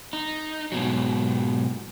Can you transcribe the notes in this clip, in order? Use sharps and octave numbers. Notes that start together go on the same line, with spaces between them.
D#4
G#2 B2 F#3